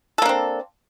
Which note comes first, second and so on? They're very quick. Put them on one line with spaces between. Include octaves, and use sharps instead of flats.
A4 A#3 D4 C4